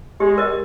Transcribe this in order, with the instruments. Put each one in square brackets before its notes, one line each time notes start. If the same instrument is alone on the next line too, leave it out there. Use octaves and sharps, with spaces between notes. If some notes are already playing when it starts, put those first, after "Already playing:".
[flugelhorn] G#3 [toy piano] G4
[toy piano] A#4 D#5